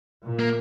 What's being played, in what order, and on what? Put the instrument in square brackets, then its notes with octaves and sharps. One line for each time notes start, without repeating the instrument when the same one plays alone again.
[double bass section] A#2
[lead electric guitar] A#3